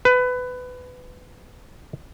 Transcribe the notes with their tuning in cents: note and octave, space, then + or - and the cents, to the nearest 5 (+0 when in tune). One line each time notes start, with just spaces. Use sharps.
B4 +20